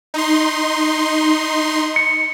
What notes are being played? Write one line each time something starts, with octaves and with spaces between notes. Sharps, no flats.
D#4 C6
C#7